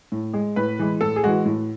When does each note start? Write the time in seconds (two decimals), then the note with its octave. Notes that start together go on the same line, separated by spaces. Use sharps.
0.12 A2
0.33 G#3
0.56 A2 B4
0.79 E3 G#3
1.01 A2 A4
1.16 G#4
1.23 E3 G#3 F#4
1.45 A2